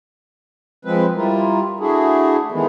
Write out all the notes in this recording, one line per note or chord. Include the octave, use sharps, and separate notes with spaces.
F3 G#3 C4 B4
G3 E4 F4 A#4
A3 D4 E4 F#4 G#4
D#3 E3 G#3 A3 B3